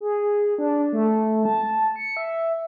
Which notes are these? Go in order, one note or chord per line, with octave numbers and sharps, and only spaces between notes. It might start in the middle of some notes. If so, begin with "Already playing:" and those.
G#4
D4
A3
A5
C#7
E5